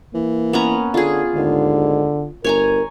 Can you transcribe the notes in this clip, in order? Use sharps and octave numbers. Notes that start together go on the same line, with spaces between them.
E3 A#3
B3 C#4 A#5
D3 F4 G#4
D#2 G#2 D3
G1 A#4 C#5 G#5 A#5